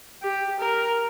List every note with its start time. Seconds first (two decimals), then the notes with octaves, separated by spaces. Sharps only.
0.22 G4
0.60 A#4